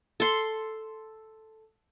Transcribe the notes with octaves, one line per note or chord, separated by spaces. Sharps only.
A4 C6